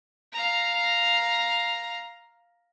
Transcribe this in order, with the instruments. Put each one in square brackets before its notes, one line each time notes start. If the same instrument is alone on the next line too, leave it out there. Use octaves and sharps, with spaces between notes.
[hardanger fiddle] F5 A#5